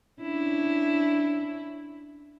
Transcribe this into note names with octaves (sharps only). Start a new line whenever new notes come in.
C#4 D4 E4